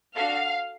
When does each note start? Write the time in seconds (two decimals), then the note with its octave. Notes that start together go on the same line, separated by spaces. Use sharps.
0.16 D4 F#4 A4 F5